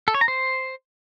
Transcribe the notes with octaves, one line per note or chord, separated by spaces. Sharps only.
A4
C#5
A#5
C5